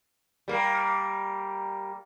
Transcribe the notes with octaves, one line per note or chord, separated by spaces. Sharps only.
G3 A#3